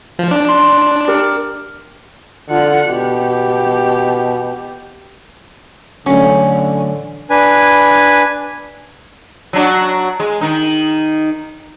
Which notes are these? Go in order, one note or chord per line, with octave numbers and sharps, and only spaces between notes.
F3
D4
C6
G4 A#4 F6
D3 F4 F#5
B2 G4
A1 D3 F#3 C#4
D4 B4 G#5
F#3 D4 F#4
G#3
D#3 D#4